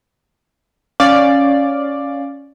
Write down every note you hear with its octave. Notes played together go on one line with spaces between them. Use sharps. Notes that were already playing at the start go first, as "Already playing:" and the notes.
C#4 D5 F5